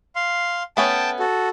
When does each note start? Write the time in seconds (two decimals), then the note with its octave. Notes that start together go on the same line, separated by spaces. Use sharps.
0.15 F5 C6
0.77 A3 B3 C#4 G5 A5
1.19 F#4 A4